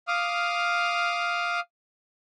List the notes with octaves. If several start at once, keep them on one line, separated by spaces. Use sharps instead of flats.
F5 D6 D#6 F6